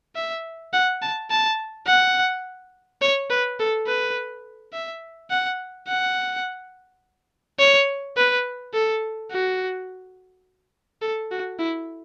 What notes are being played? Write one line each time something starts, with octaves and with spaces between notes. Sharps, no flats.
E5
F#5
A5
A5
F#5
C#5
B4
A4
B4
E5
F#5
F#5
C#5
B4
A4
F#4
A4
F#4
E4